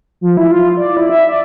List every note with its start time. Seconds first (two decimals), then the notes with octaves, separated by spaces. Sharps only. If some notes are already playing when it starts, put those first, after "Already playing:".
0.21 F3
0.37 E4
0.51 F4
0.77 D5
0.97 E4
1.09 E5
1.29 D5